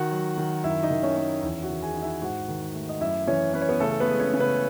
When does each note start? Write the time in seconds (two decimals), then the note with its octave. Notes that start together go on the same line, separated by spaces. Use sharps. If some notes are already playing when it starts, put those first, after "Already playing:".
Already playing: D#3 F#4 F#5
0.12 F#3
0.37 D#3
0.64 F#2 E4 E5
0.83 D#4 D#5
0.90 D#3
1.03 C#4 C#5
1.17 C#4
1.43 E2 E4 E5
1.63 F#4 F#5
1.70 D#3
1.82 G#4 G#5
1.96 D#4
2.02 E4 E5
2.22 G#2 F#4 F#5
2.48 D#3
2.75 A3
2.89 D#5
3.01 F#2 E4 E5
3.27 E3 C#4 C#5
3.54 C#4 B4
3.62 C#5
3.69 B3 B4
3.80 C#3 A3 A4
3.91 A4
4.00 B3 B4
4.07 G#3
4.20 C#4 C#5
4.34 C#3
4.40 B3 B4